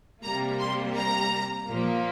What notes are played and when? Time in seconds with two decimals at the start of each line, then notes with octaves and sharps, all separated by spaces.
0.22 C3 G3 A#3 A#5
0.60 C6
0.96 A#5
1.69 A#2 F3 A#3